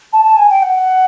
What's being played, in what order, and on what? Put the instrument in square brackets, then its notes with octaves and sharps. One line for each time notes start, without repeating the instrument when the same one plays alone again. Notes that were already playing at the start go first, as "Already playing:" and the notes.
[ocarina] A5
A5
G#5
G5
F#5